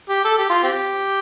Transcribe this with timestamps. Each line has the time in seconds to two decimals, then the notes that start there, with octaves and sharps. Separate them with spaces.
0.09 G4
0.24 A4
0.38 G4
0.49 F4
0.63 C4 G4